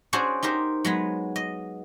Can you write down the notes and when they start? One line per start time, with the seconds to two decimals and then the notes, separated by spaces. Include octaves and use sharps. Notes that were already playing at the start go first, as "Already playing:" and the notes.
0.13 C#4 D4 F#4 G#4 C5 C#5
0.43 D#4 G4 A#4 C5
0.85 F#3 G#3 B3
1.36 D#5